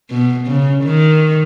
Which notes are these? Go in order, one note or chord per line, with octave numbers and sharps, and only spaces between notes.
B2
C#3
D#3